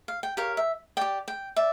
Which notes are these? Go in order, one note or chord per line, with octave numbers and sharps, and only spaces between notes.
F5
G5
G4 A#4 C#5 F5
E5
G4 D5 G5
G5
D5 E5